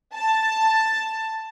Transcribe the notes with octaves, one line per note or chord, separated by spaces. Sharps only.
A5